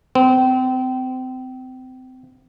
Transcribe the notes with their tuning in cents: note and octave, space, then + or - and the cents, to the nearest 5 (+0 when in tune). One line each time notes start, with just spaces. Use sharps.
C4 -30